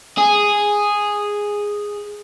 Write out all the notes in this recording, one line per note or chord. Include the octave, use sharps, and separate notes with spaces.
G#4